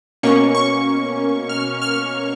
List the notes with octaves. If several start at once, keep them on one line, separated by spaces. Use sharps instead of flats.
B2 A#3 C#4 C#6
C#6
F6
F6